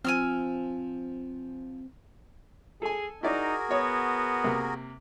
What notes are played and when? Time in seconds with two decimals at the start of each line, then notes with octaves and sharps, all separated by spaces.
0.05 F3 C4 G#5 E6 F6
2.82 G#4 A4 G#5
3.23 D#4 E4 F#4 G#4 A#4 D5
3.71 B3 C#5
4.44 C3 A#3